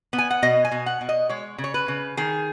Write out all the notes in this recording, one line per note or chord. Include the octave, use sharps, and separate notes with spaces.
B3
G#5
F#5
B2 D#5
G#5
B2
F#5
B2
D#5
G#3 C#5
C#3
C#5
B4
C#3
D#3 G#4